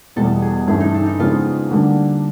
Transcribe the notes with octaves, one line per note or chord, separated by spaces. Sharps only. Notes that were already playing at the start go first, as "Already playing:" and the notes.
E2 B2 G3 A4
G#4
G2 E3 A3 C#4 E4 G#4
D#4
D4
D#4
F2 C#3 F3 G#3 B3 F4
D3 G3 A#3 D4